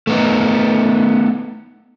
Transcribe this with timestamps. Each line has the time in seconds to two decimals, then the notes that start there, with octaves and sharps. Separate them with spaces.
0.07 A3 B3 D#4